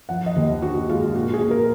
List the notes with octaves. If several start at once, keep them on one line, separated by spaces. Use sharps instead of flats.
F3 F#5
D#5
D#2
D3 F#4
G#3 F4
A#2 F#4
G#4
A#2
A#4